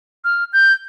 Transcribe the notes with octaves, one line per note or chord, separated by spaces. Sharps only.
F6
G6